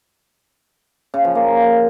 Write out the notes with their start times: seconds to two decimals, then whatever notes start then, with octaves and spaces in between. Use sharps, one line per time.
1.14 C#3
1.24 F3
1.35 A#3